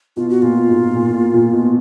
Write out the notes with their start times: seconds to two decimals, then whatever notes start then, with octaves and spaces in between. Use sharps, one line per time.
0.17 B2 F4
0.30 F#4
0.42 A#2 F4
0.69 G#2
0.95 A#2
1.14 A#2
1.34 A#2
1.53 B2